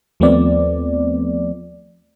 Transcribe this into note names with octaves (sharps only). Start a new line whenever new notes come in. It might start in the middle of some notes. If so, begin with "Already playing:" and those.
D#2 F3 A3 B3 C4 D5